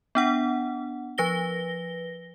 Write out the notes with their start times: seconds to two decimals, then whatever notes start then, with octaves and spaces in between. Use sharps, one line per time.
0.15 B3 D4 F#5
1.18 F3 B4 A#6 G7